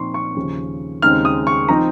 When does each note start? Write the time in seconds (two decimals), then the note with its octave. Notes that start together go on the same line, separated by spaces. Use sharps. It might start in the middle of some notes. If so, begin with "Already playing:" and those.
Already playing: A#2 F3 C4 D#4 C6 C#6
0.14 C#6
0.36 D#2 C#3 F3
1.02 D#2 C#3 G#3 C4 D#4 F6
1.25 D#6
1.47 C#6
1.69 F3 C4 D#4 A#5